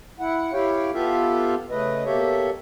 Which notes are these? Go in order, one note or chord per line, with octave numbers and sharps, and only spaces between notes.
E4 F#5
E4 G4 C#5 F5 G5
B3 F4 G4 A4 E5 F5
C#3 A3 B4 D#5
B2 A#3 G4 A4 C#5 E5